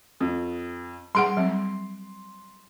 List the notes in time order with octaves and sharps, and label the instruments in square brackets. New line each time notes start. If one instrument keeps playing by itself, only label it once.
[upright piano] F2
[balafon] G3 G#4 F#5 [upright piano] C6 D7
[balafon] F#3 G3 C4